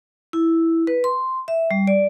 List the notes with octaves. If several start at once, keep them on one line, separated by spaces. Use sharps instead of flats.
E4
B4
C6
E5
G3
D5